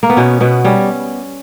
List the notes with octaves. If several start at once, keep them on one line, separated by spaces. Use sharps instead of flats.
A#3
B3
B2 C#4
B2 B3
G3 C#4